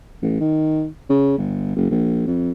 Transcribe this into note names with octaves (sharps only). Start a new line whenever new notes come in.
A1
D#3
C#3
G1
F#1
A#1
F2